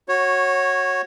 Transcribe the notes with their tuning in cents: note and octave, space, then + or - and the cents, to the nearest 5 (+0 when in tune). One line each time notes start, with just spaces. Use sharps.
F#4 +0 C#5 -15